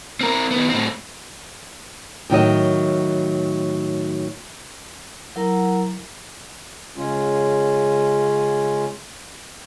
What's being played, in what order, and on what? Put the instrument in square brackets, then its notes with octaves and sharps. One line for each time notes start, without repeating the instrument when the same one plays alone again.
[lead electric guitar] C4 A#4
D#3 B3
A2 C4
[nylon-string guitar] A2 D#3 F#3 D#5
[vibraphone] F#3 E4 A#4 F#5 A#5
[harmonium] C#3 G#3 C#4 F4